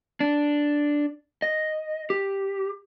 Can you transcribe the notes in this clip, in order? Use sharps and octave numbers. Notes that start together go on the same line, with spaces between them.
D4
D#5
G4